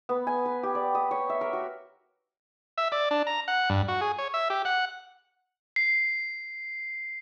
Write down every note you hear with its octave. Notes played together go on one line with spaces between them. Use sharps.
B3
G#5
B4
G4
D5
D#6
C#5
E5
A#4
F#4
E5
D5
D4
A#5
F#5
G2
F#4
G#4
C#5
E5
G4
F#5
C7